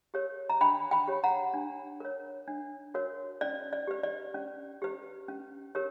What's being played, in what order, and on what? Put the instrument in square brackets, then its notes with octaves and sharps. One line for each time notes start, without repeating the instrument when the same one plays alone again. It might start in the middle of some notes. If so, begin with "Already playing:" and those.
[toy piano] G4 A#4 C#5
A#5
D4 G5 B5
G5 B5
G4 C#5
F#5 A#5
D4
A#4 C#5
D4
F#4 A#4 C#5
C#4 D5
D5
G4 B4
D5
C#4
G4 B4
C#4
G4 A#4 C#5